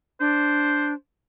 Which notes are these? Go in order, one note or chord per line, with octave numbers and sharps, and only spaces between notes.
D4 C5